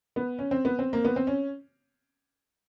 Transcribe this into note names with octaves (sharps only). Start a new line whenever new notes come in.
B3
C#4
C4
B3
C4
A#3
B3
C4
C#4